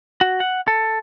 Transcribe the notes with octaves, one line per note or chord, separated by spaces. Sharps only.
F#4
F#5
A4